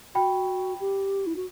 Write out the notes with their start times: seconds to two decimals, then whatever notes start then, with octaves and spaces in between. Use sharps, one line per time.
0.15 F#4 G5 B5
0.80 G4
1.26 E4
1.36 F#4